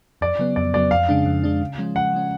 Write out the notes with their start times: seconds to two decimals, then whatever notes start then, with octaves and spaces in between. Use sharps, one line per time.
0.21 F2 D5
0.39 C#3 F#3 B3
0.56 F2 D5
0.74 C#3 F#3 B3 D5
0.91 F2 F5
1.09 C#3 G#3 D4
1.26 F2
1.44 C#3 G#3 D4
1.61 C#3
1.78 F3 G#3 C#4
1.95 C#3 F#5
2.13 F3 G#3 C#4